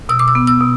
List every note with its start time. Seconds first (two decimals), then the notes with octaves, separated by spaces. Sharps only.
0.09 B2 E6
0.19 D6
0.28 E6
0.35 B3
0.47 E6
0.61 B2